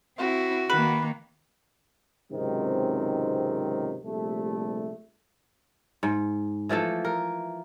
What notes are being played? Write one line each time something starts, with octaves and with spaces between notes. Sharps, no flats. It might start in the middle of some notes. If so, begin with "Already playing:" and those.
C4 E4 F#4
D#3 A#3 B4
C#2 G#2 C3 D#3 F#3 C4
A#1 C3 G3 A3
G#2
E3 F3 A3 A4
A#4